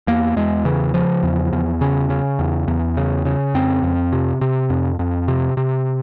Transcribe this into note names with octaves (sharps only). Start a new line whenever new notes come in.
E2 A#3
E2 G#3
C#3 E3
C#3 F3
E2
E2
C#3 C#4
C#3
E2
E2
C#3
C#3
F2 C4
F2
C3
C3
F2
F2
C3
C3